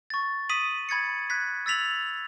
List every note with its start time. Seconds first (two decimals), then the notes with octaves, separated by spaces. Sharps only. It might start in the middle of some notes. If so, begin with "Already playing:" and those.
0.10 C#6 A6
0.49 D#6 B6 D#7 F#7
0.89 B5 G#6 A6 C#7
1.30 F#6 G#6 B6
1.66 E6 A6 B6 F7 F#7